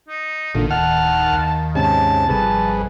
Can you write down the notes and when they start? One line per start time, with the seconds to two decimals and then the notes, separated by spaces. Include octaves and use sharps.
0.08 D#4
0.55 A1 A#2 D3 D#3
0.71 D1 F#5 A5 F6
1.33 D#2
1.75 G#2 C3 C#4 A5
2.29 G#1 F2 C3 G3 G#4 B4 A5